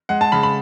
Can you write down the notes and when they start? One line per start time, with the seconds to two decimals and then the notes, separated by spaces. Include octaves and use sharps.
0.09 G#3 F#5
0.21 A5
0.32 C#3 B5
0.43 B5